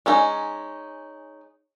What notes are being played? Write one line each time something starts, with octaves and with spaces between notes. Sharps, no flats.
G#3 C#4 D#4